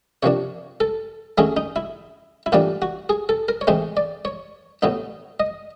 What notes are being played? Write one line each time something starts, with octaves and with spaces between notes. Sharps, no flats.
C3 F3 A#3 D4 C#5
A4
D#3 F#3 A3 C#4 G#4
D#4
E4
E4
A2 E3 G3 A#3 D4 F4
F#4
G#4
A4
A#4
C#5
A2 E3 G#3 C4 D#4 C5
D5
C#5
A2 F#3 B3 D#4
D#5